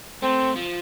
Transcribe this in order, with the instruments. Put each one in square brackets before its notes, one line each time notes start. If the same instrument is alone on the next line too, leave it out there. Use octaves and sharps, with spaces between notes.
[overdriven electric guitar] A3 [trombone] C4
[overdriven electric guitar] F3